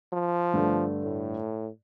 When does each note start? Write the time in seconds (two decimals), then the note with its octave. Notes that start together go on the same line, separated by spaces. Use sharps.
0.13 F3
0.53 G2 D3 A3
1.04 A2